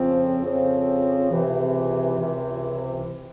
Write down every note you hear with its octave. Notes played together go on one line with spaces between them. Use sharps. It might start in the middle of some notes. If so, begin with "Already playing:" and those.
Already playing: F2 C#3 F3 C4
F2 C#3 F3 C4
C#2 C3 E3
C#2 C3 E3